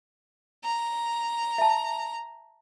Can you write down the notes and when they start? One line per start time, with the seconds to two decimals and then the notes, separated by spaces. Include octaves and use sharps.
0.64 A#5
1.58 E5 A5